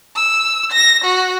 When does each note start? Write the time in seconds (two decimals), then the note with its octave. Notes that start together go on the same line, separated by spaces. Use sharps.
0.16 E6
0.72 A#6
1.04 F#4